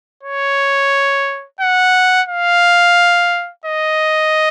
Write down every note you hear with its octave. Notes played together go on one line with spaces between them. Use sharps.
C#5
F#5
F5
D#5